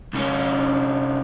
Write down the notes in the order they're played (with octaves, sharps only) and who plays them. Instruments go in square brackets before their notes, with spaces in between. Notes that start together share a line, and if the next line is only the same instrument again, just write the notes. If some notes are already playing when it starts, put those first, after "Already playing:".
[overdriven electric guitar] C2 C#4